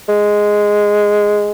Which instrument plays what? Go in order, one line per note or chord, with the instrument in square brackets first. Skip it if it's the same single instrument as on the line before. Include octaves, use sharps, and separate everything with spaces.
[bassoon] G#3